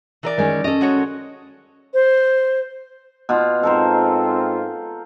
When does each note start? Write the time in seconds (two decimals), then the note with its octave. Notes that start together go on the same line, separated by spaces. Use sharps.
0.23 E3 A#4 D5
0.38 D#3 G#3 C#4
0.64 C#4 A4 D#5
0.81 G#3 F#4 C#5
1.94 C5
3.29 B2 F4
3.63 G#2 C4 F4 A4 A#4 C5